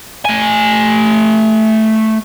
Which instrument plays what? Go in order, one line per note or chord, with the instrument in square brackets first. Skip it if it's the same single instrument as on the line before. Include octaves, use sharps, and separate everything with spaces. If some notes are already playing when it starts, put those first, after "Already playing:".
[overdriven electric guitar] A3 G#5